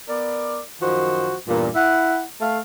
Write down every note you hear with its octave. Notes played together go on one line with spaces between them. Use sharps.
B3 A#4 D5
F#2 D#3 F3 F#4 C5
E2 G2 A#2
E4 F#5
A3 F5